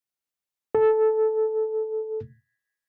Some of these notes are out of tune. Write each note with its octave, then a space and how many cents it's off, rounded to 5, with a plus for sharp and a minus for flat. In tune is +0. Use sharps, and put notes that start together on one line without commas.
A4 -10